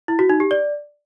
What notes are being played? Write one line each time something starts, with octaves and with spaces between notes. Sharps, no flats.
E4
F#4
D#4
G4
D5